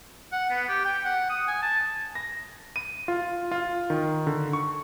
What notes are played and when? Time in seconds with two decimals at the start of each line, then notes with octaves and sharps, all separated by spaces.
0.32 F#5
0.50 B3
0.68 G4
0.85 G5
1.04 F#5
1.30 D#6
1.47 G#5
1.62 A5
2.15 A#6
2.76 D#7
3.08 F4
3.51 F4
3.90 D#3
4.27 D3
4.53 C#6